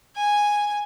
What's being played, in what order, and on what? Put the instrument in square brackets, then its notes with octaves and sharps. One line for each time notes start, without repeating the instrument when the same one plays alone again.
[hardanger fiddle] G#5